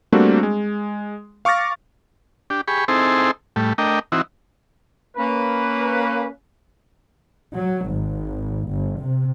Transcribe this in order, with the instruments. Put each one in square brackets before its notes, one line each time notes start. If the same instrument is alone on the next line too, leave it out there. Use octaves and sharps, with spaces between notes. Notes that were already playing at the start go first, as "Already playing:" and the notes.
[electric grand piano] G3 A3 A#3 C4 D4 F#4
G#3
F5 C#6 D6 F6 A6 A#6
[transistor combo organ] D4 G4
G4 G#4 B5 C#6
C4 D#4 E4 G#4 A4 C5
A2 G3 A3
A3 D4 A#4 D#5 G5
E3 C4 D#4 E4 F#4
[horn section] A#3 C#4 B4
[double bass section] F#3
G#1
G1
C3